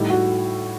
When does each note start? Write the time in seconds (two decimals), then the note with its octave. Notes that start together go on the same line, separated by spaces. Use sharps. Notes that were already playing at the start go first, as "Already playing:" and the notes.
Already playing: A2 G3 D#4
0.10 F#4